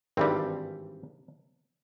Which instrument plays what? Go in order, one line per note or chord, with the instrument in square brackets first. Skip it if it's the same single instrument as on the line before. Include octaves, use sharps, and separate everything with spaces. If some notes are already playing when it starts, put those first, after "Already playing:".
[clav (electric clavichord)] G#1 G2 E3 G3 C4